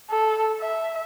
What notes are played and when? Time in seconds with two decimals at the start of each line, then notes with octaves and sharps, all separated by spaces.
0.10 A4
0.60 E5